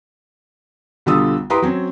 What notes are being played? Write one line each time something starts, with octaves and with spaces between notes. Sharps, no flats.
B1 D3 G3 F4 D#6 E6
E4 G4 B4 A#5 C6 D#6
F#3 C4 C#4